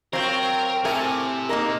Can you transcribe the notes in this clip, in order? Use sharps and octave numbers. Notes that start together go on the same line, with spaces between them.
F#3 C4 F4 A#4 F5 G5 C#6
A2 C3 A3 A#4 G#5
A#3 D#4 A#4